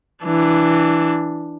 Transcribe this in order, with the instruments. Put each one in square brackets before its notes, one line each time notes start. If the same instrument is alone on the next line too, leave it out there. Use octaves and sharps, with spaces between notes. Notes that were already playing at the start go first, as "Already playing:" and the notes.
[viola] E3 D4